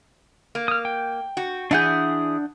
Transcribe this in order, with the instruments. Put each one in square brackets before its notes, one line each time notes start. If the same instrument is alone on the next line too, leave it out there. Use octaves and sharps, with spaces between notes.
[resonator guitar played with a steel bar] A#3
[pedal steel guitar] D#6 F6
G5
[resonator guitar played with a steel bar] F#4
[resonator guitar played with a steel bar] E3 E4 G#4 [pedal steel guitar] D4 F#5 G6